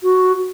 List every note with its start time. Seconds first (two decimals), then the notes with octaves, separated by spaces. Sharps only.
0.03 F#4